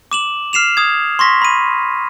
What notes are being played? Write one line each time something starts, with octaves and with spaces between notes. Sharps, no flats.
D6 E7 F#7
F6 C7 E7 F7
D#6 G#6
C6 C#6 A#6 B6
B5 D#7